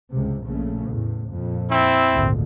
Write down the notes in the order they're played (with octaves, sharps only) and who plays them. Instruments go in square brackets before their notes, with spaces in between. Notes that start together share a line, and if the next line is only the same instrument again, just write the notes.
[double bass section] C#2 G2 C3
A#1 C#3 A3
E2 A2
F2 A#2
[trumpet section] C4 E4
[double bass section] G#1 D2 A#2